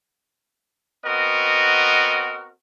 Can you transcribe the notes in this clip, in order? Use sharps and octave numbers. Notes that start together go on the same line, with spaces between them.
B3 C4 F#4 A#4 D#5